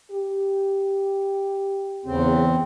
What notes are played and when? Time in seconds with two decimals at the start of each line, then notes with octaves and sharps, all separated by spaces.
0.11 G4
2.06 E2 C#3 C4